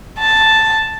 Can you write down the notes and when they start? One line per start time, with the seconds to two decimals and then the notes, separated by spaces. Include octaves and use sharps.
0.19 A5